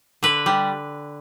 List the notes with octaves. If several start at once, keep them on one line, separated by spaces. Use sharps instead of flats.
D3 B4
G3